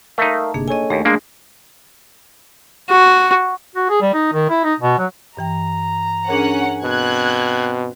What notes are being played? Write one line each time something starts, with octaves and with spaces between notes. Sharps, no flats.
A3 D#4 A#4 E5 F5
G1 C3 A#3 D4 G#4
A4 C#5 D#5 G#5
D#2 A3
G#3 A#3 D4 G#4
F#4
F#4
G#4
G3
D#4
D#3
E4
D#4
B2
F#3
G2 E3 G5 A#5
C#4 D4 G#4 A#4 F#5
B2 C4 F#6 G#6